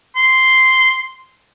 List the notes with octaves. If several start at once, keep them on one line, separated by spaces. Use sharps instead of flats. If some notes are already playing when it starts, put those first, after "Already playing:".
C6